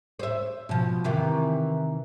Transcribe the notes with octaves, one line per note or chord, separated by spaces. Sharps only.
C5 E5
B2 F3
C3 D#3 E3